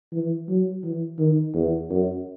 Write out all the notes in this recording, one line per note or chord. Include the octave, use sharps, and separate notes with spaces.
E3
F#3
E3
D#3
E2
F#2